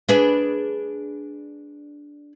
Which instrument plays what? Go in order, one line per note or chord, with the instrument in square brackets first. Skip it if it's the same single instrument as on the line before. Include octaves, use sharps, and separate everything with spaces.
[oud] D4 G#4 B4